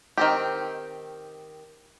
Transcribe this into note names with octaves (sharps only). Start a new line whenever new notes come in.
D#3 C4 G4